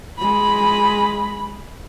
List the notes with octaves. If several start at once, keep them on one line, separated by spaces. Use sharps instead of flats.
G#3 B5